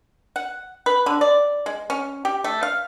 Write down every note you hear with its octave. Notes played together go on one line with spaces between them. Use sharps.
F#5
B4
D3
D5
G#3
C#4
G4
A3
F5